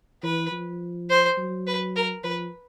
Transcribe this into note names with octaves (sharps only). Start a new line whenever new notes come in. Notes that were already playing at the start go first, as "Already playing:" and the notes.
E3 B4
F3
C5
F#3
B4
A#4
F3 B4